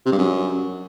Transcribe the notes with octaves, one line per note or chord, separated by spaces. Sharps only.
C3
G2
F#2